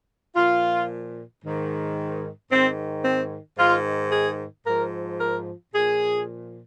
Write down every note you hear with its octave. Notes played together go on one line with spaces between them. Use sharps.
A#2 F3 F4
G#2 D#3
G#2 D#3 C4
C4
G#2 D#3 F4
G#4
G#2 F3 A#4
A#4
A#2 F3 G#4